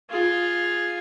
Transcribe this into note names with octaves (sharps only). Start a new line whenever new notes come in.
F4 G#4